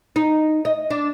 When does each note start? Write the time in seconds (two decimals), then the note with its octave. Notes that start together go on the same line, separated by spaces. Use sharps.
0.16 D#4
0.65 D#5
0.90 D4